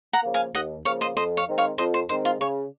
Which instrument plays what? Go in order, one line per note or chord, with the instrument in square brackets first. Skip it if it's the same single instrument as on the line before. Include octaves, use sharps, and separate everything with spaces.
[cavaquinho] F#5 A#5
[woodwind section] C#3 F3 A#3
[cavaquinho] F5 G#5
[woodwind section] D#2 [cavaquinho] D#5 F#5
[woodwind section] C#3 F3 A#3 [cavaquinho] C#5 F5
[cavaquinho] C5 D#5
[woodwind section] F2 [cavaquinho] C5 D#5
[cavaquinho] C#5 F5
[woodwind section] D#3 G#3 C4
[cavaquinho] C#5 F5
[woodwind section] F2 [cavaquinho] C5 D#5
[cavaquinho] C5
[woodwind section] D#3 G#3 C4 [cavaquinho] C5
[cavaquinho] F4
[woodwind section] C#3 [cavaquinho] C#5